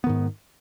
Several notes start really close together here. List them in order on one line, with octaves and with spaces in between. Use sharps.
B3 D#3 G#2